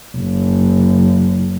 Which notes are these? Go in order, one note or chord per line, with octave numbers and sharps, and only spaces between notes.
F#1